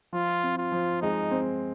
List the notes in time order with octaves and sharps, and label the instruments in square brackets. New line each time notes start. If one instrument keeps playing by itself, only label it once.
[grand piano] F3 [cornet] F4
[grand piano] C4
[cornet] F4
[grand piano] F3
[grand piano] G#3 [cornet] D#4
[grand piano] C4